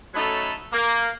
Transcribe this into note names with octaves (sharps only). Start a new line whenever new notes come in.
F#3 A3 C#4 D#4 A4 B5
A#3